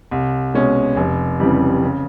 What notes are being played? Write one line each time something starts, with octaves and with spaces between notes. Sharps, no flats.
C2
B2 G#3 C#4
F1
F2 C#3 E3 G3
C#3